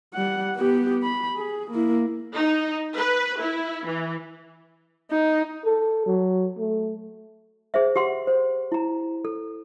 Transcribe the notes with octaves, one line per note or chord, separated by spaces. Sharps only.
G3 F#5
B3 G4
B5
G#4
A#3 E4
D#4
B4
E4
E3
D#4
A4
F#3
A3
G#4 C5 E5
G4 F#5 C6
C5
E4 A#5
A4